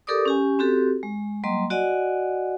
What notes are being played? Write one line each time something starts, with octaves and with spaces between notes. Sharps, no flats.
G4 A4 A#4 D5 D6 D#6
C#4 G4 G#5
C4 F#4 G4 A4
G#3
F#3 G3 A#3 D#5 C6
F#4 D5 D#5 F#5 G#5